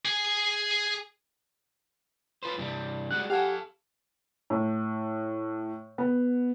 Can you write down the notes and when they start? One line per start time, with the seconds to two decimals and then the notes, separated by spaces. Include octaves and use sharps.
0.05 G#4 G#5
2.43 F4 B4 C5
2.58 G2 C3 G3
3.11 G3 G#3 F#4 F#6
3.30 G4 A4 F5 F#5 G#5
4.50 A2
5.98 B3